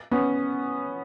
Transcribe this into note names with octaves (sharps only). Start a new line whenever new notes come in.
B3 C#4